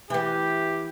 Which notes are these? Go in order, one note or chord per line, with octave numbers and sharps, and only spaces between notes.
E3 B3 G4